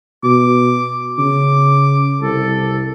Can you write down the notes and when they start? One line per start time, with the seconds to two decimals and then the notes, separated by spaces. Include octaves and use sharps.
0.24 B2 D6
1.18 C#3 D6
2.22 C2 A4